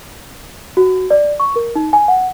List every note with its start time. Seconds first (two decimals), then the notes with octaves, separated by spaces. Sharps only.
0.77 F#4
1.11 D5
1.40 C#6
1.56 A#4
1.75 D#4
1.93 G#5
2.08 F#5